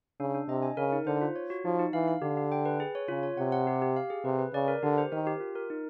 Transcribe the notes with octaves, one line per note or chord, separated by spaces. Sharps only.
C#3 D4
D4
C3 D#5
G#5
C#3 A#4
D#4
D3 C5
F4
C#5
F#4
F3 D#4
D#4
E3 F5
F5
D3 G4
G4
G5
B4
G#4
C#5
C#3 F4
C#5
C3 F#5
F#5
G4
G4
F5
G#4
C3 B4
B4
C#3 D5
A#4
D3 G4
C5
D#3 A#4
G4
F4
A#4
D#4